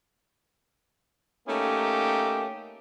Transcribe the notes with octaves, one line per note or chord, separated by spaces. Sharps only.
A3 A#3 C#4 D#4 G4